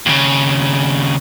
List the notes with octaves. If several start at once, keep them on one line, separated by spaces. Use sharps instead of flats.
D#2 C#3